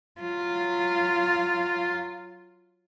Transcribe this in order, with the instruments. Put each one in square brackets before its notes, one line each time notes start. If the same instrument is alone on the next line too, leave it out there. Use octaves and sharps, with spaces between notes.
[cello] F#3 F4